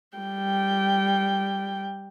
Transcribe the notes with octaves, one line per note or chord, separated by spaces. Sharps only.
G3 G5